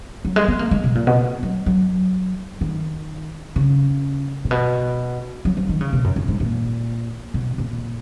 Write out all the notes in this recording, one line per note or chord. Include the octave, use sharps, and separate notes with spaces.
F#3
G#3
B3
A#3
G#3
B2
A#2
B2
F#3
F#3
D#3
C#3
A#2
B2
F#3
F3
D#3
C#3
B2
F#2
F#2
G#2
A#2
B2
A#2